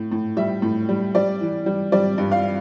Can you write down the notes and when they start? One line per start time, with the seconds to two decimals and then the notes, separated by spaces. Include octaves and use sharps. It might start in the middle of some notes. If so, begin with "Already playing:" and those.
Already playing: A2
0.12 A2
0.37 G3 E5
0.62 A2
0.89 G3
1.15 G3 D5
1.41 E3
1.66 G3
1.92 G3 D5
2.18 G2
2.32 F5